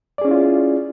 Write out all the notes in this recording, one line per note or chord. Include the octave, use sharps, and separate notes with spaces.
C#4 E4 F4 G#4 D5